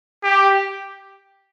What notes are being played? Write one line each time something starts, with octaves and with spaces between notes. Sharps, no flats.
G4